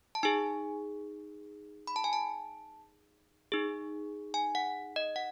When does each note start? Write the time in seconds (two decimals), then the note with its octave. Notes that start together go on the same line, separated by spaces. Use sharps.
0.15 A5
0.23 D#4 G#4 G#5
1.87 B5
1.96 A5
2.04 G#5
2.13 A5
3.52 D#4 G#4
4.34 G#5
4.55 F#5
4.96 D#5
5.16 F#5